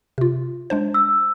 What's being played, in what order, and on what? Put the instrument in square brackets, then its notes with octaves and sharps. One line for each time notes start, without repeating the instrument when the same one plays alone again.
[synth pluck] C3 F4
G#3 D4 C5
[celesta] E6